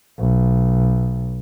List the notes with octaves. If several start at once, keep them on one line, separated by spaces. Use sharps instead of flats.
B1